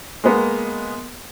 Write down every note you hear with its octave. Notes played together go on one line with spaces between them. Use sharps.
G#3 A#3 B3